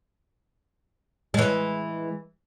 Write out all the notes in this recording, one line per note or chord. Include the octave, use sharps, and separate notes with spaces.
E3 G#3